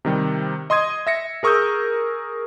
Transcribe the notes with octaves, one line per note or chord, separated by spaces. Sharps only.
C3 D#3 G3
D#5 C6 D#6 G#6 D#7
E5 A#6 C#7
G#4 A#4 C#6 D#6 E6 G6